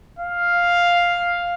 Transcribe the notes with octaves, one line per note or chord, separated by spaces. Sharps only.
F5